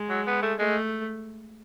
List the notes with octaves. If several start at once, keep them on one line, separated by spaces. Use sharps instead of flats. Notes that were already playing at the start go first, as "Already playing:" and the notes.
Already playing: G#3
F#3
B3
A3
G#3 A3